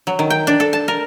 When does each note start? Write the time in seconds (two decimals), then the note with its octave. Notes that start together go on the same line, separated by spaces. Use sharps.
0.07 F#3
0.19 D#3
0.30 G5
0.47 D4
0.60 A4
0.73 A5
0.88 A#4